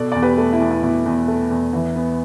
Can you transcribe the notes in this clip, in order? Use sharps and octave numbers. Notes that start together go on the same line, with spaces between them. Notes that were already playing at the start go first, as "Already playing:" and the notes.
Already playing: B2 A4 D5
E2 D5
G4 B4
A3
E4
E2
E4
B2 E4
E2
A3
E2
E3
B3